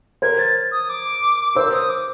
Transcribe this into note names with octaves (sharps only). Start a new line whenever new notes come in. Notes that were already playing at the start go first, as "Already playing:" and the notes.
A#4 C5 G#6
A6
D#6
D6
A#4 C5 E6
D#6
D6